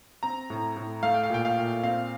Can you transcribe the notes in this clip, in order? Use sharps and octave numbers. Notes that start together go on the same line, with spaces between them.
C4 A#5
A2
A2
A3 F5
G5
F5
A#2 G5
F5
A#2
C4 F5